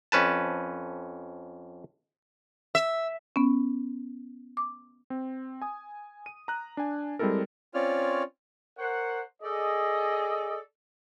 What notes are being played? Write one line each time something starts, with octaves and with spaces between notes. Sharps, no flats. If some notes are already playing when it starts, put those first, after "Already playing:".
F2 C#4 B4 A5
E5
B3 C#4
D6
C4
G#5 D#6
D#7
A#5 F#6
D4 G#5
G3 G#3 C4 E4 A4 A#4
C4 C#4 F4 C#5 D5 F6
A#4 C5 C#5 F#5
G#4 A4 D5 D#5